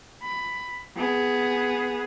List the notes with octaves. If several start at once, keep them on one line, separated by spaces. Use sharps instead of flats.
B5
B3 G#4